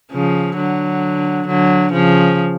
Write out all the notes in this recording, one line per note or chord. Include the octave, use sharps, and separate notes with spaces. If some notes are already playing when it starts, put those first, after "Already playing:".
C#3 F3
D3 F#3
D3 F#3
C#3 F3